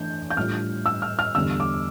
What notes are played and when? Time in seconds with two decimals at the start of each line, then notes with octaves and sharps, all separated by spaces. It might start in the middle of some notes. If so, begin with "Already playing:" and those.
Already playing: E3 A3 D4 G6
0.31 G6
0.37 A2 G3 D4 F4 F6
0.86 E6
1.02 F6
1.19 F6
1.35 E2 D3 G3 E6
1.60 D6